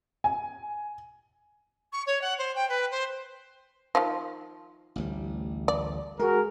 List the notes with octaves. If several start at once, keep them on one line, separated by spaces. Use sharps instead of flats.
G#5
C#6
C#5
F#5
C5
G5
B4
C5
D#3 F3
A1 D2 G3
D5
G#3 F#4 G#4 A#4